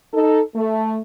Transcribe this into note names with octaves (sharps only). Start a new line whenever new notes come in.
D#4 A4
A3